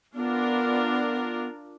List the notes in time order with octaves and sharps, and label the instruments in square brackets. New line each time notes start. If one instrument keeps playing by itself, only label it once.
[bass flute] B3 [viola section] D4 F4 A#4